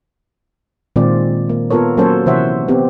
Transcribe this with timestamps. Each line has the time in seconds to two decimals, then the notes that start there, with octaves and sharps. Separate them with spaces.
0.96 A#2 D#3 G#3 C4 F4 D5
1.50 A#3
1.70 B3 F4 A4 A#4 C#5
1.97 F#3 A#3 C#4 A4 C5 C#5
2.26 C3 E3 C5 C#5 E5 F#5
2.68 B3 C4 G4